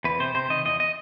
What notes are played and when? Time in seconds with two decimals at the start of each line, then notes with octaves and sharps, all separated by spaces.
0.04 E2 B4
0.20 C3 C5
0.34 C3 C5
0.50 D#3 D#5
0.65 E2 D#5
0.80 D#5